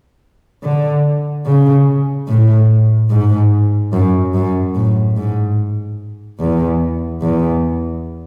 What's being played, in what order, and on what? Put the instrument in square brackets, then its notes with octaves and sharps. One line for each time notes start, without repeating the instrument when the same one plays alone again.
[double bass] D3
C#3
A2
G#2
F#2
F#2
A2
G#2
E2
E2